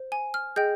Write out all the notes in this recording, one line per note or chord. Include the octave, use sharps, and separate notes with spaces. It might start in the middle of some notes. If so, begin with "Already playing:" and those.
Already playing: C5
G#5
F6
G#4 D#5 G5 G6